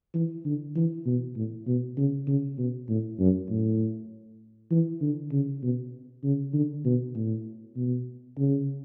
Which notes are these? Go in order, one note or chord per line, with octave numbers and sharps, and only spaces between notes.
E3
D3
E3
B2
A2
B2
C#3
C#3
B2
A2
F#2
A2
E3
D3
C#3
B2
C#3
D3
B2
A2
B2
C#3